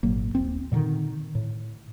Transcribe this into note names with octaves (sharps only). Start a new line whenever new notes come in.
G#1 A#2 F#3 A#3
D#1 C4
A#2 D3 D#3
A2